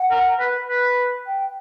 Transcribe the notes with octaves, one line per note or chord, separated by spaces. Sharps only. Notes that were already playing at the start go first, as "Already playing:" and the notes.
Already playing: F#5
A#4
B4
B4
G5